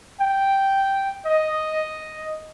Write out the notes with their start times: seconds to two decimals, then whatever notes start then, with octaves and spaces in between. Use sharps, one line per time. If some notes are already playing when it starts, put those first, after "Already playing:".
0.20 G5
1.26 D#5